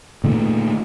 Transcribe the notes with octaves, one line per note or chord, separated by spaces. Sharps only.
A#2 D#3 A3